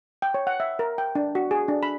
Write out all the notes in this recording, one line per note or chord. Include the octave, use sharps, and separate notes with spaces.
G5
C#5
F#5
E5
A#4
G5
D4
F#4
G#4
D4
B5